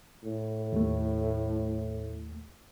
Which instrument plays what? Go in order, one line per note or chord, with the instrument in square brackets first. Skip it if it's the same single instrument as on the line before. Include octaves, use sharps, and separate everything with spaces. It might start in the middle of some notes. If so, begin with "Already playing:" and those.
[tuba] A2
[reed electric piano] D#2 A3